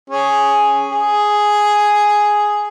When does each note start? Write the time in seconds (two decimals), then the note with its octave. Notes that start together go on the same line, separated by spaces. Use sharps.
0.10 C#4 G#4
0.92 G#4